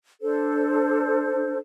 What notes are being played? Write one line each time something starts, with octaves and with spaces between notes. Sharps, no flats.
D4 A4 C5